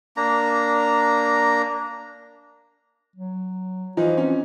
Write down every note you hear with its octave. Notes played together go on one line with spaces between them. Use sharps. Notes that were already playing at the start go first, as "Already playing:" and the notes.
A#3 D4 A#5
F#3
E3 F3 D#4 F4
C4 C#4